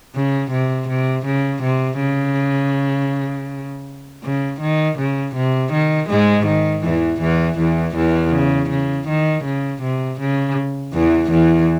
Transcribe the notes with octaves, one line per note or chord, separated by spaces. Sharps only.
C#3
C3
C3
C#3
C3
C#3
C#3
D#3
C#3
C3
D#3
G#2 G#3
D#3
E2 E3
E2 E3
E2 E3
E2 E3
C#3
C#3
D#3
C#3
C3
C#3
E2 E3
E2 E3